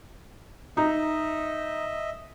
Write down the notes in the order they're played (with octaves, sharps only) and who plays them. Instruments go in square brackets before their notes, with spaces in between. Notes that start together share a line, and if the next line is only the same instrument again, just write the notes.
[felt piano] D#4 [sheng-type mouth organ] D#5 E5